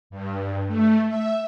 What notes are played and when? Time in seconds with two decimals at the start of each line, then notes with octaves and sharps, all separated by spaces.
0.10 G2
0.67 A3
1.06 E5